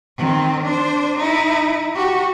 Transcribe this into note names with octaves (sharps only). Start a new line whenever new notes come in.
D#3 C4
D4 C5
D#4 E4
F#4 G4